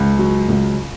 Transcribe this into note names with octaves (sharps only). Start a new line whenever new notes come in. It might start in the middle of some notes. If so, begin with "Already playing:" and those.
Already playing: C#2
F#3
C#2